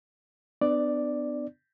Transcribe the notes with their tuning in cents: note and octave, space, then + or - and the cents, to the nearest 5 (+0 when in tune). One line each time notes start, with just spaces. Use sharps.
B3 +35 D4 +35 D5 +0